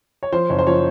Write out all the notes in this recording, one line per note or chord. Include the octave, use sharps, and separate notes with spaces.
C#5
F3 C5
F#1 C#5
C5
F3 C#5